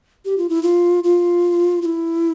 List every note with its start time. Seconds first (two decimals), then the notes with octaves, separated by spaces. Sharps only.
0.25 G4
0.37 F4
0.49 E4
0.63 F4
1.04 F4
1.82 F4
1.85 E4